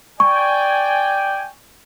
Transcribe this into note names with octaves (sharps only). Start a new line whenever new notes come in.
D5 G5 G#5 C#6